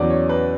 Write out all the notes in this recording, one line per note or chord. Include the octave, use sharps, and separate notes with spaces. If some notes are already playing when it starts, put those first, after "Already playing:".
Already playing: E2 C#3 F#3 D5
C#5
B4